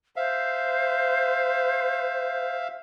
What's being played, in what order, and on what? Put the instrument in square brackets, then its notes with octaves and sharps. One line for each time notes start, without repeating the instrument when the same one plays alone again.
[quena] C5 [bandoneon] E5 F5